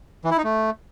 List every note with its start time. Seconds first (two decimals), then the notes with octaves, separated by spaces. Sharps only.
0.25 E3
0.31 E4
0.38 D#4
0.44 A3